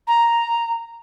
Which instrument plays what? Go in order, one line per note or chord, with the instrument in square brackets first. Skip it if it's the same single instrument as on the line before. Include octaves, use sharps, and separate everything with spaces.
[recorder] A#5